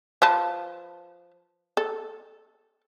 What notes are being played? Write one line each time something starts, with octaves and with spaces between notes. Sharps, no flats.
F3 B4 A5
A4